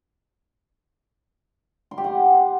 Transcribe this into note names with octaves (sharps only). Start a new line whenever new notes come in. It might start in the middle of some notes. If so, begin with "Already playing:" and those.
C6
G4
F#5